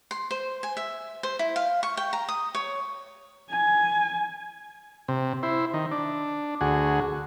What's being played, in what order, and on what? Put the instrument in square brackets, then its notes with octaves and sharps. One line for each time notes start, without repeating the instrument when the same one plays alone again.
[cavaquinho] C6
C5
G#5
E5
C5
E4
F5
C#6
G5
A#5
D#6
C#5
[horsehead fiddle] G#5
[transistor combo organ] C3
E4 C5
D#3
D4
D2 F#4 G#4